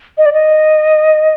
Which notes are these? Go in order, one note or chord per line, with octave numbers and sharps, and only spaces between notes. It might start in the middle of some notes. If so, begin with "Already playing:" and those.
D#5
D5
D#5